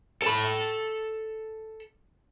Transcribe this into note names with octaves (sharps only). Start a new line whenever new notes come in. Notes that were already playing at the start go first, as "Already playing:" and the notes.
A4 B5